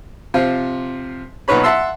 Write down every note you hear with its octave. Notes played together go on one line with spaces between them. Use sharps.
C3 F3 F4
B1 A#2 D#4 B4 C#5 B5
E5 F#5 A5 C6 E6